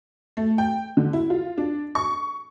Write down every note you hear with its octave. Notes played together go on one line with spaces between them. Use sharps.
A3
G5
D3
E4
F4
D4
C#6